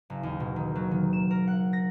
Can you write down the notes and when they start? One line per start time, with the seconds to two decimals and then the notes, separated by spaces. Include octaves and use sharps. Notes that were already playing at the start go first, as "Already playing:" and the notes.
0.10 F#1
0.23 D#2
0.40 B2
0.56 D#3
0.76 F#3
0.91 D#3
1.13 E7
1.30 A#4
1.48 F#5
1.73 A#6